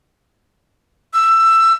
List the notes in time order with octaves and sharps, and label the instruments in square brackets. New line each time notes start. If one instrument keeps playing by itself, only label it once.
[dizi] E6